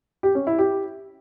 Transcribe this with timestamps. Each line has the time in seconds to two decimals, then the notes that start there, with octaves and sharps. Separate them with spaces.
0.23 G4
0.35 C#4
0.47 E4
0.59 G4